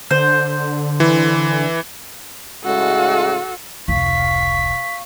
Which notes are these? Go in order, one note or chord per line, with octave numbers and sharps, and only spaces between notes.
D3 C5
E3
A2 C#3 G#3 F#4 A4
F1 C#2 F5 C#6 B6